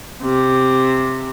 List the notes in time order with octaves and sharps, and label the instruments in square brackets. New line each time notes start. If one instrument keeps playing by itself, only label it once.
[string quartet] C3